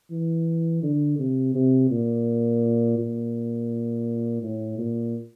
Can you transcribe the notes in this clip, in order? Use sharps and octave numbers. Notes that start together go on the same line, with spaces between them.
E3
D3
C3
C3
A#2
A#2
A2
A#2